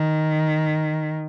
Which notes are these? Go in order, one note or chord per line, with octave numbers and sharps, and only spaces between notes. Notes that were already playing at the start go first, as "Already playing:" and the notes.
Already playing: D#3